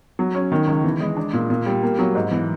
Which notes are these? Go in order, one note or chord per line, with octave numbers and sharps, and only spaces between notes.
F#3
C#4
D#3
C#2
E3
G#3
D4
A#2
A#2
G3
A#3
F#3
G#2
E3